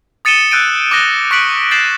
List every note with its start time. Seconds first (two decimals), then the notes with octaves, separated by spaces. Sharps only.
0.25 D#6 A6 C#7 D#7 E7 G7
0.51 E6 F#6 G6 A6 D7 D#7
0.91 D6 D#6 F#6 A#6 G7
1.31 C#6 F#6 B6 C#7 D7 F#7
1.71 G6 A6 C7 E7 F#7